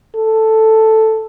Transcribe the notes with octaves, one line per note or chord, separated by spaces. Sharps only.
A4